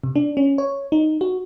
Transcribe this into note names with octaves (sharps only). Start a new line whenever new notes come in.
C3
D4
C#4
C#5
D#4
F#4